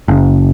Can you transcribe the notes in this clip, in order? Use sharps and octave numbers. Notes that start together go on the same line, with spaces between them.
F#1